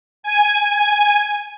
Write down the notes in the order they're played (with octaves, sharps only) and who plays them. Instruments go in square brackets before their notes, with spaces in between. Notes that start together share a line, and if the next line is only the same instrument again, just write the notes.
[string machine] G#5